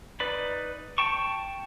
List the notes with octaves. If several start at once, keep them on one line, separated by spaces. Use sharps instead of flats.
D#4 B4 D5 B5
G5 A5 C#6